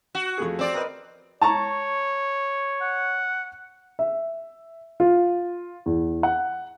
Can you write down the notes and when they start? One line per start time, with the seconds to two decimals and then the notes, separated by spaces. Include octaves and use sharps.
0.15 F#4
0.38 F2 A3 G#4
0.59 C4 D5
0.74 A#4 B4 D#5
1.42 C#5 A5 A#5 C#6
2.81 F#5
3.99 E5
5.00 F4
5.86 E2
6.23 F#5